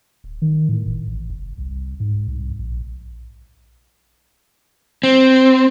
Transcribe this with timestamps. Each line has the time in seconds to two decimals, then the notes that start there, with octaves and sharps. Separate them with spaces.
0.24 D1
0.42 D#3
0.69 A2
0.86 F#1
1.08 A1
1.30 F#1
1.58 C2
2.00 G#2
2.28 C2
2.59 A#1
5.03 C4